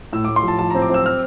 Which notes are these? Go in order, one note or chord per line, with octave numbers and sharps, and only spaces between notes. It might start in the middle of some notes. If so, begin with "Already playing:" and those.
A2 E6
A2 D6
C6
F3 A5
F3 A5
C4 A#5
D6
C4 E6
F6